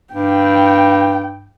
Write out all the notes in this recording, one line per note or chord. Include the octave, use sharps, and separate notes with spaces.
G2 G5